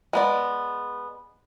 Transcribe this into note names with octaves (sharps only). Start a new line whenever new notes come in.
G#3 B3 D5